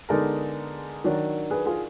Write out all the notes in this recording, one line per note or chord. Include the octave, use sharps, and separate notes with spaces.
D3 G#3 B3 D#4 A#4 D5
D#3 F#3 D4
G#4 B4
F4 G#4